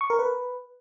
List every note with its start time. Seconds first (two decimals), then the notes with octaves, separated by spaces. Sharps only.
0.01 C#6
0.10 A#4
0.19 B4